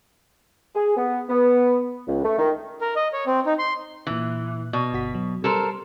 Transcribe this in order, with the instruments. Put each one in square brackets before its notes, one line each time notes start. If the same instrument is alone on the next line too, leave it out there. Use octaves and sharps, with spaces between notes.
[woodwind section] G#4
B3
B3
C#2
A3
D#3
[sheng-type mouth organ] A#4
D#5
C#5
C4
D#4
C6
[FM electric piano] A#2 F#6 [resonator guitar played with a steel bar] E3
[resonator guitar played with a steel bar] B2 [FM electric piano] D5
[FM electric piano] G1 F#4 B6
F#3
[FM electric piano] G3 [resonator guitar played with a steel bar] A4 A#4 C5